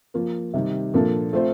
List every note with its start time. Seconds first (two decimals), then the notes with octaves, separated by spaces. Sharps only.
0.14 F3 A#3 F4
0.54 C3 D#3 G3
0.94 A#2 F3 A#3 D4 A4
1.33 A3 C4 F4 C5